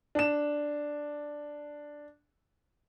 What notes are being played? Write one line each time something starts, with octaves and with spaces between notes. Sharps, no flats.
D4 E7